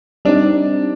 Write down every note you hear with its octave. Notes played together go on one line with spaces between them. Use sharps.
G3 C4 D4 D#4